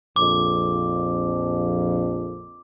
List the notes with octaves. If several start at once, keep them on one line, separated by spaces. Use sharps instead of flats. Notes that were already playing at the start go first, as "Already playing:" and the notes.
A#1 F2 D6